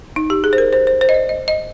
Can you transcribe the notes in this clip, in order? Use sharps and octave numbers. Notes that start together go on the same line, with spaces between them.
D#4
G4
G#4
C5
A#4
C5
C5
C5
D#5
D5
D#5
D#5